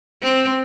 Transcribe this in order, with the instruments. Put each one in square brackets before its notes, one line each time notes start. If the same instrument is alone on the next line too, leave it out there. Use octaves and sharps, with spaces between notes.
[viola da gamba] C4